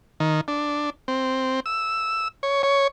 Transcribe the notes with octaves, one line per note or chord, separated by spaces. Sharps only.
D#3
D4
C4
E6
C#5
C#5